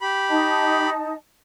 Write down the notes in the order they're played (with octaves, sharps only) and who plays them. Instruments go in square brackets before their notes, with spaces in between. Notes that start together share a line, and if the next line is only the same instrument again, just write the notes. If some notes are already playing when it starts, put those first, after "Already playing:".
[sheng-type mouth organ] G4 B5
[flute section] D#4 D#5 A5